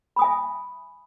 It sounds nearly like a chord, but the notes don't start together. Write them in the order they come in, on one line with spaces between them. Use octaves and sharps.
B5 D#6 G#5 E5